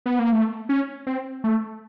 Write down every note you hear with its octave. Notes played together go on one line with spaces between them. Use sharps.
B3
A#3
A3
C#4
C4
A3